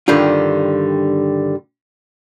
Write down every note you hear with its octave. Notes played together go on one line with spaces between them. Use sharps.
G2 D3 D#3 G3 F4